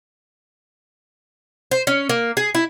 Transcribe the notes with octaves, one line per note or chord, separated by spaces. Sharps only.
C5
C#4
A#3
G#4
E4